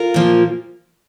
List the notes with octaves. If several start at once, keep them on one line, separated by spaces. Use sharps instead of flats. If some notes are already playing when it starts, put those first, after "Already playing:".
Already playing: F4 A#4
A#2 F3 A#3